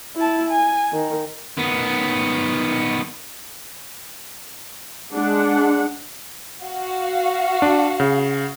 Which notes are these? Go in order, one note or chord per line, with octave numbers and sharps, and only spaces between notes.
E4 A5
G#5
D#3
D#3 B3
G#3 D4 F#5
F#4 F5
D4
C#3